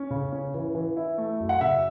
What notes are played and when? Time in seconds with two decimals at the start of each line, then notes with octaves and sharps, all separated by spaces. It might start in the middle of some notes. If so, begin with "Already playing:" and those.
Already playing: C#4
0.11 C#3
0.32 C#4
0.54 E3
0.75 E3
0.97 E4
1.18 A3
1.40 F#2
1.49 F#5
1.61 C#3 E5